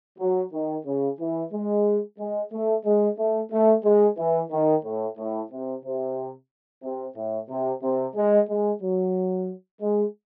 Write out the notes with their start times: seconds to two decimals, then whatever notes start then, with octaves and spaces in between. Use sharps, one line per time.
0.19 F#3
0.53 D#3
0.86 C#3
1.20 E3
1.53 G#3
2.19 G#3
2.51 A3
2.85 G#3
3.18 A3
3.51 A3
3.84 G#3
4.17 E3
4.51 D#3
4.83 A2
5.17 A2
5.51 C3
5.84 C3
6.83 C3
7.16 A2
7.49 C3
7.82 C3
8.16 G#3
8.49 G#3
8.81 F#3
9.81 G#3